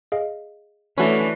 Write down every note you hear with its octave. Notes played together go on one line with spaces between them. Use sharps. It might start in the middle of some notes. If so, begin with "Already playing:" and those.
G#4 D#5 F5
E3 A3 C#4 D4 F#4 B4